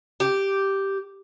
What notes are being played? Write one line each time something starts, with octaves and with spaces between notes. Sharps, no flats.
G4